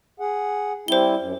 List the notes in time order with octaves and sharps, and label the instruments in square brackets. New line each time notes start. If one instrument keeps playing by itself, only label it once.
[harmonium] G#4 F#5
[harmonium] G3 C4 E4 [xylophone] C5 G7
[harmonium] F#2